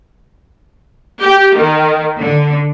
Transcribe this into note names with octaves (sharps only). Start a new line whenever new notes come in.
G4
D#3
D3